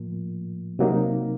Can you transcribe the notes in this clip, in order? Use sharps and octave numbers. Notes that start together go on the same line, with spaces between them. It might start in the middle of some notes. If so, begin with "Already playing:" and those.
Already playing: A2 F3 A#3
C3 F#3 A#3 D#4